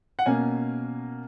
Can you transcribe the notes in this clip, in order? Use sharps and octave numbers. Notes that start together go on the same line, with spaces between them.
F#5
B2 A#3 C#4 G#5